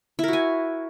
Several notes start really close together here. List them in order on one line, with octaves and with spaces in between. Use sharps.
E4 A#4 F#4 G#5